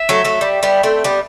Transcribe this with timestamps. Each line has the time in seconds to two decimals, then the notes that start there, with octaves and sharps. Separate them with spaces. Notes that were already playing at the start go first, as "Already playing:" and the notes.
Already playing: E5
0.09 F#3 A3
0.24 F#3 A3
0.41 G3
0.63 G3 B3
0.83 A3 C4
1.04 G3 B3